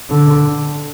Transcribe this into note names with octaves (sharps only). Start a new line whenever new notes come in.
D3